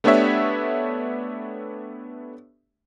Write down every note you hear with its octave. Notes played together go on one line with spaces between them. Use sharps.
A3 B3 D4 G4 C#5 E5